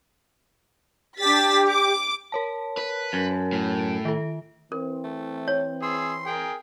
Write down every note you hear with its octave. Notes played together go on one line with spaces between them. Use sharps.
D4 G4 A6 B6
D6
A#4 C#5 A5
B4
F#2
A2
D7
D#3 A4
E3 C4 A#4
A3
C#5
G#4 C6 E6
G#4 A#4 G5